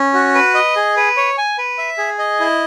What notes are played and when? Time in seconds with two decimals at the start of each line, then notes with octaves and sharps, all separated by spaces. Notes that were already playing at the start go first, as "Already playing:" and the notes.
Already playing: C#4
0.14 F#4
0.35 B4
0.55 D#5
0.76 G#4
0.97 B4
1.17 C#5
1.38 G#5
1.58 B4
1.78 E5
1.98 G#4
2.19 D#5
2.40 E4